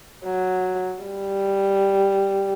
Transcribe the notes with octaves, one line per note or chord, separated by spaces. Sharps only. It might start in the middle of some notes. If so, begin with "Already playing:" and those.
F#3
G3